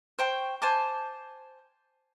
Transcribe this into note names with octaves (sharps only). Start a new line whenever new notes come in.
C5 G5 C#6
C5 G#5 A5 D6